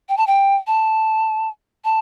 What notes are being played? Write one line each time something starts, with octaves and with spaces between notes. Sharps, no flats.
G5
A5
G5
A5
A5